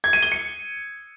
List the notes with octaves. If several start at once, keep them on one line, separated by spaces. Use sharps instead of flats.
G#6
D#7
G7
C#7